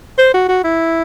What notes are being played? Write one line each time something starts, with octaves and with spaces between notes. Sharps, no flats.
C5
F#4
F#4
E4